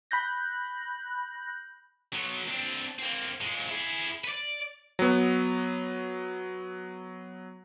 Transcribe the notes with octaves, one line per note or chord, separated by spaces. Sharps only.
B5 F#6 G6 A#6
F#3 B3
C4 D4
A#3 C4
A#2 G#3
E4 G#4
B4 D5
F#3 B3